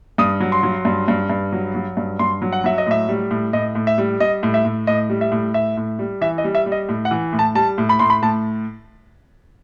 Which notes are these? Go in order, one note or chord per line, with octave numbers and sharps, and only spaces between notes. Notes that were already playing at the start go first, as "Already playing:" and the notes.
G2 D#6
F#3
C6
F#3
G2
G2
G2
F#3
F#3
G2
G2 C6
F#3
F#5
F#3 E5
D#5
A2 E5
G3
A2
A2 D#5
A2
E5
G3
G3 D#5
A2
E5
A2
A2 D#5
G3
E5
A2
A2 E5
A2
G3
E3 E5
D#5
G3
E5
G3
D#5
A2
F#5
E3
A2
A5
G3 A5
A2
B5
A2 C6
B5
A2 A5